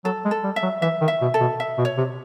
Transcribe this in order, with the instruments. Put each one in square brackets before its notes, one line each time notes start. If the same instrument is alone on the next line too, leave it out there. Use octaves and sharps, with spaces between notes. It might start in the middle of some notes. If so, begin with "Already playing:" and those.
[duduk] F#3 [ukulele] A4
[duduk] G#3
[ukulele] A4
[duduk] G3
[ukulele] E5
[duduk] F#3
[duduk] E3 [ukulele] E5
[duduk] D#3
[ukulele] E5
[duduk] B2
[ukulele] A4
[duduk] B2
[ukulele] E5
[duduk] B2
[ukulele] C#5
[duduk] C3